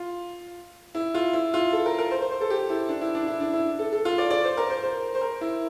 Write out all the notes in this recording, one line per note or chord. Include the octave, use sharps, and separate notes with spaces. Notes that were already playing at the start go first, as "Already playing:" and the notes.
Already playing: F4
E4
F4
E4
F4
A4
A#4
A#4
C5
C5
C5
A4
G4
E4
D4
E4
D4
E4
D4
E4
A4
A4
F4
D5
D5
C5
A#4
C5
C5
C5
A#4
E4